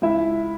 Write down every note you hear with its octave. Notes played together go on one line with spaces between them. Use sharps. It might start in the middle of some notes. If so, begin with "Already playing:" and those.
C#2 E4 E5